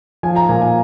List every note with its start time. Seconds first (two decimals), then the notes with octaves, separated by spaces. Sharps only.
0.23 F3 G#5
0.36 A#5
0.49 A#2 G#5
0.62 G#5